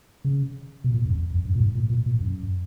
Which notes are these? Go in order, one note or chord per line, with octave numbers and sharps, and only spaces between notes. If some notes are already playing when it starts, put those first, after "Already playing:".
C#3
B2
A#2
F#2
F2
F2
F#2
A#2
G#2
A#2
A#2
A#2
F#2